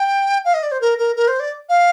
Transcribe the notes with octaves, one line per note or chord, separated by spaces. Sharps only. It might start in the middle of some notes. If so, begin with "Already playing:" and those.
Already playing: G5
F5
D#5
D5
C5
A#4
A#4
A#4
C5
D5
F5